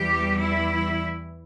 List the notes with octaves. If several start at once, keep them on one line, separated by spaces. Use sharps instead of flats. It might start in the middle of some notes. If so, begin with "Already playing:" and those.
Already playing: E2 E3 G3 G4
E4